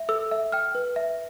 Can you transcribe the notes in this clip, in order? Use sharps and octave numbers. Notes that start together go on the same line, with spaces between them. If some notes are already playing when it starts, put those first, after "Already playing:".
Already playing: E5
A4 E6
E5
G5 F6
B4
E5